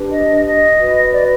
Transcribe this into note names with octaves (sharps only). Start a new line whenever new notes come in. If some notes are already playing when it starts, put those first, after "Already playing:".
Already playing: D4 G4 B4
D#5
D#5
F#4 B4
D5